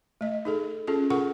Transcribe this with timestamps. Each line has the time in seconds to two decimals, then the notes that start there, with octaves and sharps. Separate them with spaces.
0.21 A3 D#5
0.45 D#4 G#4 A4
0.87 C#4 F4 G#4 A4
1.10 F4 G#4 A#4 F#5 C#6